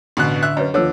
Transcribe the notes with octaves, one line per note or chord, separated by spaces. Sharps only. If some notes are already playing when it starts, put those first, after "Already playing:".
A1 B2 D3 F#6
E5 F#6
F#2 B4 C#5 D#5
D#2 D3 F3 A4 C#5 E6